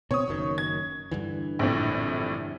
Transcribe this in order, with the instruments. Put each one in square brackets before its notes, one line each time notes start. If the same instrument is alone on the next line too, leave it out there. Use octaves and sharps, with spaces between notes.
[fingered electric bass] B2 C4 [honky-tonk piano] C#5 D#6
[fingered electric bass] F#1 F#2 D#3
[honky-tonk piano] G#6
[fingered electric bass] G2 D3 E3
[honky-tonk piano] A#1 F2 A2